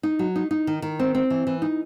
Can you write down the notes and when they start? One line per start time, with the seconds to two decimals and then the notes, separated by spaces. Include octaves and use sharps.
0.03 D#4
0.19 F#3
0.36 D#4
0.51 D#4
0.67 D#3
0.82 D#3
0.99 C4
1.15 C4
1.30 E3
1.47 E3
1.62 D#4